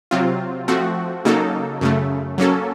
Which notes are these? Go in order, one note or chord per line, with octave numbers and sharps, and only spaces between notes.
C3 F#3 C4 F4
F3 A3 C4 F#4
C#3 F#3 A#3 D#4 A4
F#2 C#3 A3
F#3 A#3 C#4 A4